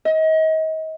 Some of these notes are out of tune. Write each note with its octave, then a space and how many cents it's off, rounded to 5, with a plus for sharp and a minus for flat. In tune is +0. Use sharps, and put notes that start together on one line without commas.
D#5 +35